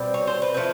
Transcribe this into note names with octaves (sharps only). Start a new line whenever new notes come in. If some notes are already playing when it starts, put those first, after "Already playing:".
Already playing: B2 G3 C4
C#5
C5
B4
F3 A3 C4